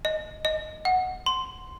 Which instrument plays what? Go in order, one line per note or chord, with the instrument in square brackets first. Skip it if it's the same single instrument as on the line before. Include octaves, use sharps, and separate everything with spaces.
[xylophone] D#5
D#5
F#5
C6